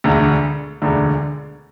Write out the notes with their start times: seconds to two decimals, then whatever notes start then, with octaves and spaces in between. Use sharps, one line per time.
0.04 E1 D2 D3
0.82 E1 D2 D3